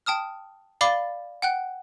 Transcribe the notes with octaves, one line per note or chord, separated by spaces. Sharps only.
G5 A5 D#6 F6
D5 F5 B5 D6 A6 G7
F#5 G5 F#6